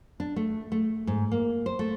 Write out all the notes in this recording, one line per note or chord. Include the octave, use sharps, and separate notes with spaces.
D4
A3
A3
G#2
A#3
C5
A3